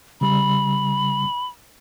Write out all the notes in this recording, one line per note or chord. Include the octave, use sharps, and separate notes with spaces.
C#3 G3 B5